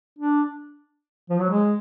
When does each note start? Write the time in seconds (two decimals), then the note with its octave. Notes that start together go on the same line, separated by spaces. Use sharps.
0.19 D4
1.30 F3
1.40 F#3
1.50 G#3